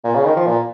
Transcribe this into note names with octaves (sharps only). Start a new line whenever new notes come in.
A#2
C#3
D#3
F3
A#2